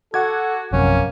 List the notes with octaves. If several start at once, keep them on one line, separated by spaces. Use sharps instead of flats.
F#4 A4 F#5 D6 G#6
A#1 F#2 C3 A#3 C#4